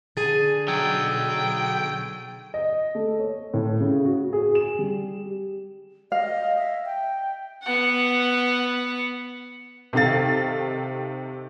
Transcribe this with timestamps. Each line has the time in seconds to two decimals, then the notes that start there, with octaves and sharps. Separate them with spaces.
0.17 D3 G#4 G#5 A6 D#7
0.68 B1 F#3 G5 E6 G#6
2.54 D#5
2.95 A3
3.19 C#5
3.54 A2
3.80 C#3
4.05 F#4
4.33 G#4
4.55 E7
4.79 G3
6.12 D#5 F5
6.58 E5
6.85 G5
7.63 B3 F#5
9.93 C3 D#3 A4 F5 A6